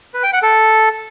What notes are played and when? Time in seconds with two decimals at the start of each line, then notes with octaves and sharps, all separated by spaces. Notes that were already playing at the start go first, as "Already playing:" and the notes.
0.14 B4
0.23 G5
0.33 F#5
0.42 A4